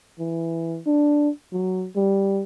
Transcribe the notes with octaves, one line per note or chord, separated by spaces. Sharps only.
E3
D4
F#3
G3